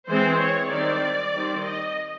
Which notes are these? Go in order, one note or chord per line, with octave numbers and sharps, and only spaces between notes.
E3 G#3 C4 C5
C#5
D#3 G3 C4 D5
D#3 G3 C4
D#5